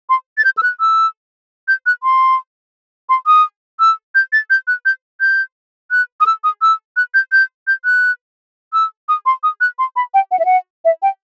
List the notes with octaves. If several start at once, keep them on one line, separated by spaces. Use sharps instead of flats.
C6
A6
G6
E6
F#6
E6
G6
F#6
C6
C6
D#6
E6
G6
A6
G6
F#6
G6
G6
F#6
D#6
E6
D#6
E6
F#6
G6
G6
G6
F#6
E6
D#6
C6
D#6
F#6
C6
B5
G5
F#5
E5
F#5
E5
G5